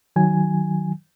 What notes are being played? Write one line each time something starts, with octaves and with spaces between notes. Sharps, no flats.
D#3 F#3 G#5